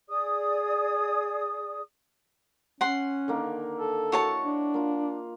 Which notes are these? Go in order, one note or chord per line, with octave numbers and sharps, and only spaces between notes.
G#4 D5 D#6
C#4 F#5 C6
D3 D#3 A#3
A4
E4 F#4 C#5 A5
D4
A#3 F4